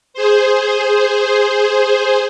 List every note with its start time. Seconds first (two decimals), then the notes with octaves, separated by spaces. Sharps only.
0.14 G#4 C5